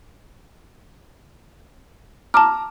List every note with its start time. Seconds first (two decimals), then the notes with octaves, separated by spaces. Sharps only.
2.34 A5 A#5 D6 F6